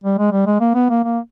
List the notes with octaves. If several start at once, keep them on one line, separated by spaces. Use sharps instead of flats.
G3
G#3
G3
G#3
A#3
B3
A#3
A#3